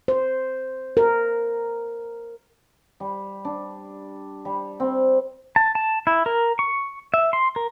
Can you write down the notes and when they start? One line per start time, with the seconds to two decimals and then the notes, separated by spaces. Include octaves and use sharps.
0.08 C5
0.97 A#4
3.00 G3
3.45 D4
4.45 G3
4.80 C4
5.56 A5
5.75 A5
6.07 E4
6.26 A#4
6.59 C#6
7.14 E5
7.33 C6
7.56 A#4